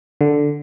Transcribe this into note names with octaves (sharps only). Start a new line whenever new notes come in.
D3